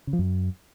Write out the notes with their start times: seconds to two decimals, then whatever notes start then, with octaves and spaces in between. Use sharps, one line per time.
0.07 C#3
0.13 F3
0.19 F#2